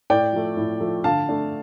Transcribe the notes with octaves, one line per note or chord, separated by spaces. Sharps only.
A2 D5 G5
F3 A3
A2
F3 A3
D3 F5 A5
A3 D4